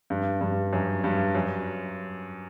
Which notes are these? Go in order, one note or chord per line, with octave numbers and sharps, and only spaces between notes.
G2
G2
F#2
G2
F#2